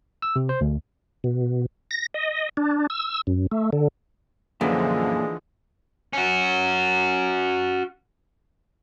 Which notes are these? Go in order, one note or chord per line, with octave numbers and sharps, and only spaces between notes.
E6
C3
C5
D2
B2
A#6
D#5
D4
E6
F#2
A3
D3
F#2 A#2 D3 E3 F3 G#3
C#4 F#4